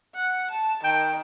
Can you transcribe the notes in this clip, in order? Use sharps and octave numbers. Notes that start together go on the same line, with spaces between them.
F#5
A5
D#3 G5